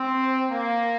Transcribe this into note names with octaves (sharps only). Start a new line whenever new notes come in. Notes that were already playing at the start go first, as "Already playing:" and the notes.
Already playing: C4
A#3